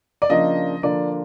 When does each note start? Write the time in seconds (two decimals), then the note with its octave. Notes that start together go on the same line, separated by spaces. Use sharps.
0.22 D5
0.30 C#3 F3 A#3 D4 D#5
0.83 D3 F3 A#3 D4 D5